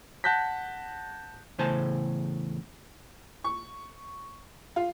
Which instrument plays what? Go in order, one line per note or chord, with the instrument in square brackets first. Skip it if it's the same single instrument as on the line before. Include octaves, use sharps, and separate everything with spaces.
[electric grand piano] F#5 A5 F#6 G6 A#6 B6
[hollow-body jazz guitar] E2 A2 C#3 C5 G#5 A5
[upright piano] C#6
F4